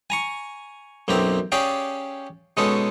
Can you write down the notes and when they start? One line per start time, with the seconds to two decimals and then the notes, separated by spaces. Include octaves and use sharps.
0.10 G#5 A#5 C#6
1.08 B1 F#2 A#3 C4 G4 A#5
1.52 C#4 G4 G#4 D5 F5 G5
2.57 B2 G#3 C#4 D#4 A4